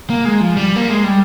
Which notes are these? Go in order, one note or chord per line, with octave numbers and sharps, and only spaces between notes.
A#3
G#3
F3
G3
A#3
G#3
G3